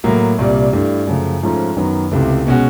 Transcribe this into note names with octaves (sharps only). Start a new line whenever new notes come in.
A2 F#3 A#3
C2 A#2 G3
G2 E3 A3
F#2 C#3 F3 A3
G#2 F3 A3 C#4 F4
F#2 D#3 F#3 B3
C#2 C3 E3 A3
B2 G#3 C#4 F#4